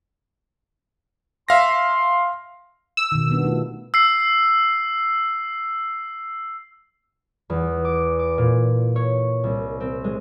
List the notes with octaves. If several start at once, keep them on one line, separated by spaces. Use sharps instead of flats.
E5 F5 C6 A#6
E6
B2 D#3
G3 B3 D4
A3 D#4 F4
E6 C7
E2
D6
D6
A#2
C#5
C2
C4
G#3